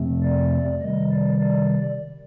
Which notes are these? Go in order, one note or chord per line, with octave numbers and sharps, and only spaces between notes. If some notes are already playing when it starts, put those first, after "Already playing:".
Already playing: F2 C3 F3 A3 C4
D5
C3 D#3 G3 D#5
D5
D5